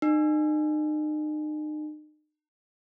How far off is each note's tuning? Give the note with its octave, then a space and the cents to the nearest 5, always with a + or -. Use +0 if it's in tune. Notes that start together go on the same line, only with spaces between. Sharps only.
D#4 -40